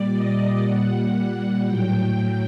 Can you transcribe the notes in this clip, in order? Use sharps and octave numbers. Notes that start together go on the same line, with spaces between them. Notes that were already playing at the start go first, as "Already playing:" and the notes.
Already playing: A#2 G3 D5
D#5
A#2 G3 F#5
F#5
A2 F#3 G5